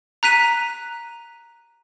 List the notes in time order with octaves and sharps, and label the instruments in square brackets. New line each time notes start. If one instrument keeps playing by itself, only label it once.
[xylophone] A#5 F#6 B6 D#7